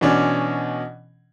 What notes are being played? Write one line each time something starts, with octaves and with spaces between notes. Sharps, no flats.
B2 E3 C#4 D4